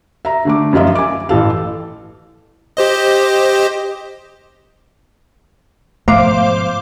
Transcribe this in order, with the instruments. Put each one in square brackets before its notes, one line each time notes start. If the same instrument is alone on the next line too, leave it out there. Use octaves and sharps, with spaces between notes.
[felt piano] E5 A#5
D3 A3 D6
F#2 F3 F4 D#5 E5
G#5 D6
A1 E3 A4 F5
[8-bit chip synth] G4 C5 D#5
[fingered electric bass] G#2 B2 F3 [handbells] A3 [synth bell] C5 F5 D6